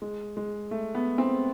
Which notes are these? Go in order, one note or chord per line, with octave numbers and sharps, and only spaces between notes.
G#3
G#3
A3
B3
C4